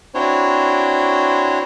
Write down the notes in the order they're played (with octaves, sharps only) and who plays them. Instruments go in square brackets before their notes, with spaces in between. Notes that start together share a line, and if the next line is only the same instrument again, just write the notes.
[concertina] C4 D4 E4 F#4 C5 C#5